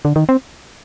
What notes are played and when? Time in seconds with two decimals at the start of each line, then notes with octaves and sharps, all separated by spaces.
0.05 D3
0.16 D#3
0.29 C4